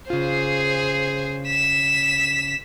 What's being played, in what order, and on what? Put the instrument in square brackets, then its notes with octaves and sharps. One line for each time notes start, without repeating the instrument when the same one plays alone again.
[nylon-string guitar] C#3 F4 [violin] G#4 C5
[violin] B6 E7